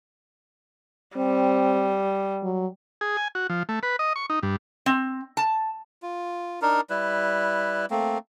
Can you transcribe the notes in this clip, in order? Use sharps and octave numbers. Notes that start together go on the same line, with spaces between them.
G3 C4
F#3
G#4
G#5
F#4
F3
A3
B4
D#5
C#6
D#4
G2
C4
A5
F4
D4 D#4 A#4
G3 E4 B4
A3 A#3 C4